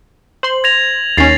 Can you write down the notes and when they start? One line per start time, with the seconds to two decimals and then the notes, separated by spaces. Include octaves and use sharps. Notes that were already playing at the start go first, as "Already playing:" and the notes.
0.43 C5 C6 F#7
0.64 G#6 A#6 F7
1.17 D#2 C#4 A6 C7 F7